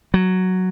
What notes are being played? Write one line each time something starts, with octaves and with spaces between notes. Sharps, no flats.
F#3